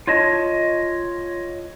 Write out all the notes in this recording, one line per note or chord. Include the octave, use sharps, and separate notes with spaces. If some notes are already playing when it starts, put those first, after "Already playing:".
F4 C#5 D#5 A5